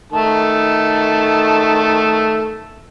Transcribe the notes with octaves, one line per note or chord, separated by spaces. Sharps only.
D#3 A3 A5